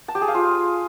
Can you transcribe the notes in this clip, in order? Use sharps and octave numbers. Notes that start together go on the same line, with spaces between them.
A5
G4
G#4
F5
F4